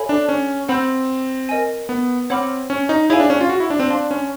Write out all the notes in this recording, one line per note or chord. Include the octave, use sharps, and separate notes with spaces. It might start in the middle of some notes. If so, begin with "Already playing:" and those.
Already playing: A4 C#5 E5 G#5 B5
D4
C#4
C4 F#5 B5 E6 G6
A#4 D#5 G#5
B3
C4 C#5 F#5 B5 D6 F6
C#4
D#4
E4 G#4 C#5 F5 G#5
D4
C#4
F4
F#4
E4
D4
C4
D4 F5 A5 C6
C#4